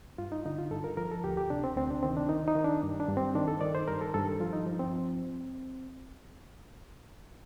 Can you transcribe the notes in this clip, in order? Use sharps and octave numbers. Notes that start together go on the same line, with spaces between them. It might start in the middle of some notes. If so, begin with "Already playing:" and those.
G2 F4
D#4
D3 D#4
F4
G2 A4
A#4
F3 A#4
A4
D2 G4
G4
C3 D4
C4
D2 C4
D4
D#3 C4
D4
D#3 D#4
D#4
D#3
D4
G2
D4
G2
C4
D#3 D4
A4
D#3 D5
C5
G2 A#4
A4
G2 A4
F3 F4
D#4
F3
C4